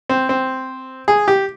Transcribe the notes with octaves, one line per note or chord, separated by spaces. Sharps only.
C4
C4
G#4
G4